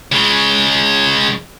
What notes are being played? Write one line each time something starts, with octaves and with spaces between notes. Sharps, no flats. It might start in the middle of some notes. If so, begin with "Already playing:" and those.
C#3 G#3